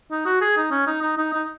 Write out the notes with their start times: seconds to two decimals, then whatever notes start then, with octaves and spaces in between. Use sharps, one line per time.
0.11 D#4
0.26 F#4
0.41 G#4
0.57 D#4
0.71 C#4
0.87 D#4
1.02 D#4
1.18 D#4
1.33 D#4